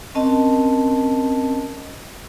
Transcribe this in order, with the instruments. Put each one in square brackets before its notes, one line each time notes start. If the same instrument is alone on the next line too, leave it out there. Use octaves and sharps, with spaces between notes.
[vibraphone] C4 C#4 A#4 D#5 A5